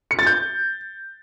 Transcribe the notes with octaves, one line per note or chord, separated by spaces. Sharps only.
C#7
A6
G6